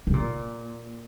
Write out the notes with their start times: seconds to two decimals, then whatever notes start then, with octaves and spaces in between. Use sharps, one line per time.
0.07 C3
0.14 A#2